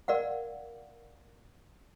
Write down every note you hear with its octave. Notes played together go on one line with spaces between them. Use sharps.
A#4 D5 F5 F#5